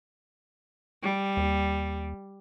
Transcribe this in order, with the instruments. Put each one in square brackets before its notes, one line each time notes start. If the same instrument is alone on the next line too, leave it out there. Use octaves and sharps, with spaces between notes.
[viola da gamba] G3
[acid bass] D#2